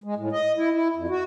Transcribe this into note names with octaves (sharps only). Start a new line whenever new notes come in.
G#3
A2
D#5
E4
E4
F2
F#4